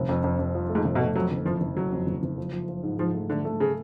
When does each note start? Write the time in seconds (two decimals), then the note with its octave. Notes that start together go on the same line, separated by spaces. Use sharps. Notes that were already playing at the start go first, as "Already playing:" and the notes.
Already playing: F1
0.09 F2
0.24 F2
0.39 F2
0.55 F3
0.70 A3
0.75 G#2
0.85 F1
0.95 B2
1.00 A3
1.15 F2 F#3
1.31 F#1
1.46 F#1 F3
1.61 F#1
1.76 F#1 F#3
1.92 F2
2.07 F#1
2.23 F#1
2.38 F3
2.53 F3
2.69 F3
2.83 G#2
2.99 G#2 F3
3.14 A3
3.30 D3 A3
3.45 A3
3.60 C#3